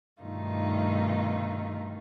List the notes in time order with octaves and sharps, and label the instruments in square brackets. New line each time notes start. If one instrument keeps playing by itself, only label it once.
[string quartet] G2 B2 D#3 A3 D#4 F4